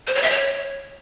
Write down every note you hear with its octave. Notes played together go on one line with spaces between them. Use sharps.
C5
C#5
E5
C#5